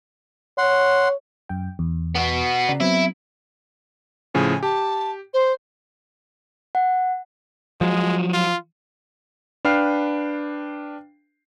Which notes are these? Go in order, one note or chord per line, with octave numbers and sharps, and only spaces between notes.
C#5 F#5 C6
F#2 G5
E2
B3 F#4
C#3 D5 A#5
F#3 B3 C4 E4
A2 C#3 F3 G#5
G4 A5
C5
F#5
F3 F#3 G#3
F4
D4 B4 F5 G5 F6 C7